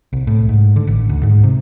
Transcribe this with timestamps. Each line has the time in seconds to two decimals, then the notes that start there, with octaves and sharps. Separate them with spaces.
0.13 C2
0.27 A2
0.49 G#2
0.76 D3
0.87 A1
1.09 D2
1.23 G#2
1.43 C3